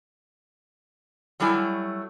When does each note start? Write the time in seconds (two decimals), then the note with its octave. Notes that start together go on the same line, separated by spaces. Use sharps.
1.40 F#3 G3 A3 E4 G#5